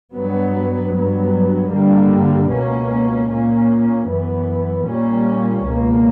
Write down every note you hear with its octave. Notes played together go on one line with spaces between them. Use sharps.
G2 F#3 B3
G2 F#3 B3
G2 D3 G3 A#3
C#2 B2 A#3 C#4
A#2 A#3 C#4
F#2 E3 B3
A#2 G3 A#3 C#4
C#2 B2 A#3